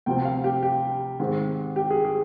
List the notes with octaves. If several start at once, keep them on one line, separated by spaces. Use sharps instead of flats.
D2 C3 F3 C4 G5
F5
G4
G4
G#2 D#3 G#3 C4
G4
G#4
G#4